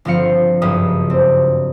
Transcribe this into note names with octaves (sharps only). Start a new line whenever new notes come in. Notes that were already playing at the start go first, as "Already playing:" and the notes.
G1 F3 C4 F5 C#7
F#1 C#2 G2 D#6
C4